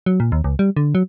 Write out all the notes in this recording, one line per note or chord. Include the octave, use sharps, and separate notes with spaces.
F#3
A#2
D#2
C#2
G3
D3
F#3